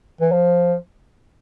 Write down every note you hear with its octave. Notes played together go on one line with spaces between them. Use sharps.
E3
F3